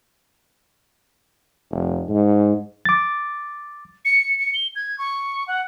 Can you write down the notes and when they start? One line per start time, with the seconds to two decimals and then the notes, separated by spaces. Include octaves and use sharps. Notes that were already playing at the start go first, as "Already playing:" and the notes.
1.71 F1
2.09 G#2
2.85 D6 A6
4.05 C#7
4.39 C#7
4.54 G7
4.76 G#6
4.98 C#6
5.48 F#5